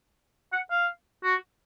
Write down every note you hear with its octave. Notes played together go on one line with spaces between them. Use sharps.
F#5
F5
F#4